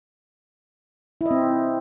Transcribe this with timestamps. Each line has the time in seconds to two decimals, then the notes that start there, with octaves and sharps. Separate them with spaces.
1.21 E4
1.26 D#5
1.31 C4